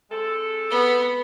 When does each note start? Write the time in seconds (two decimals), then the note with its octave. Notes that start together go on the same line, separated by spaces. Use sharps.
0.10 G#3 C4 A4
0.70 B3